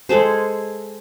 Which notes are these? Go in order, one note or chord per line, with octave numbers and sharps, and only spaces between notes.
G#3 G#4 A4 C5